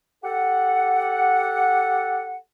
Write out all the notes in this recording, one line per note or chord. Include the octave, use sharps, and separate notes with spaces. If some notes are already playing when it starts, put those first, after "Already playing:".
G4 A4 F#5